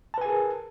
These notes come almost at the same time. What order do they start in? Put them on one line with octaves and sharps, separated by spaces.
A5 B4 G#5 G#4 A#4